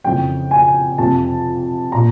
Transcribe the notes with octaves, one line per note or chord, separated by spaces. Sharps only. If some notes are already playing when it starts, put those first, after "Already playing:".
F2 C#3 E3 G5
G#5
F2 C3 F3 A5
A#2 A#5